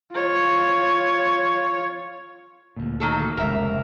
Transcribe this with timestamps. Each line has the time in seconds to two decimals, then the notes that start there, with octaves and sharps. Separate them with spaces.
0.11 F4 C#5
2.76 D2 A#2
3.00 D#3 F#3 A4
3.19 A#3
3.37 F1 C#2 A#4 E5